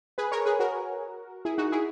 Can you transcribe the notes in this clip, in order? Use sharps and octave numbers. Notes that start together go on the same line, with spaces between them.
G#4 B4
A#4 C#5
G#4 B4
F#4 A#4
E4 G#4
D#4 F#4
E4 G#4